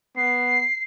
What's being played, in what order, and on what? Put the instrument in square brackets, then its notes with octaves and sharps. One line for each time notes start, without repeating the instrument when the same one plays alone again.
[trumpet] B3 [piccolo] C7